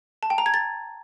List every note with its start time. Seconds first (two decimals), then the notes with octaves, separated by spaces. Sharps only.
0.23 A5
0.30 G5
0.38 A#5
0.46 G#6
0.54 A6